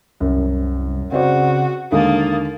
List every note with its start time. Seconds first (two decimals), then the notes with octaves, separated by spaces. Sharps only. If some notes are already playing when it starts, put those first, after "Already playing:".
0.20 C2 F#2
1.12 C#3 C4 F#4 C5 D5
1.92 D#2 D3 G#3 A#3 D#6 A6